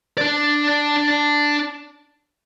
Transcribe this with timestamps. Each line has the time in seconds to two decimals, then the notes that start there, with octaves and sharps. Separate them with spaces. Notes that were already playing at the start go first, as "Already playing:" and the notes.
0.18 D4 D5